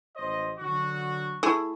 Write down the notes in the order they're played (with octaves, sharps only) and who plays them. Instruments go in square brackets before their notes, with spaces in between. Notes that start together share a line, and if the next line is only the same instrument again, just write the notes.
[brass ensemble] A1 C5 D#5
D3 F#3 F#4
[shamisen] A3 E4 G#4